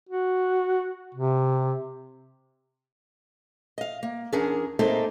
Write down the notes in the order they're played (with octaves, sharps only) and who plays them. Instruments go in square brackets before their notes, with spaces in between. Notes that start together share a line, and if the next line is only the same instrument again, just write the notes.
[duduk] F#4
C3
[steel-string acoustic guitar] D#5 F5
A#3
E2 C#4 D4 G#4 A#4
A3 A#3 C4 D#4 G#4 A4